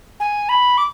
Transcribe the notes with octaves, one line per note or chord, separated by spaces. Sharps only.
G#5
B5
D6